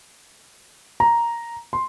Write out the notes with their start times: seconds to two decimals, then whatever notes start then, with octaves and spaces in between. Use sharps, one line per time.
1.00 A#5
1.73 C6